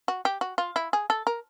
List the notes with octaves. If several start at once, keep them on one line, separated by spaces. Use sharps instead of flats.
F#4
G4
F#4
F4
E4
G#4
A4
A#4